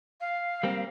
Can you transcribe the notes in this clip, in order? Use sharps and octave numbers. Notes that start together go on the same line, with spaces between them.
F5
G3 A#3 C4